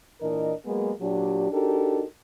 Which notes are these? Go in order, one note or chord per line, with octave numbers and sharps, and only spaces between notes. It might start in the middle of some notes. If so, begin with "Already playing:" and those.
A#2 E3 D4 A#4 D#5
F#3 G#3 A#3 B3 G#4
A#2 F#3 D4 G4
D4 D#4 F#4 G4 A4 A#4